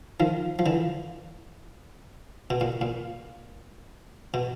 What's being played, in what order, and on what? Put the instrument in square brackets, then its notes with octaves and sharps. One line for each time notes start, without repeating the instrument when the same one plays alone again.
[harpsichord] D#3 F3
F3
D3 E3
B2
A#2
A#2
B2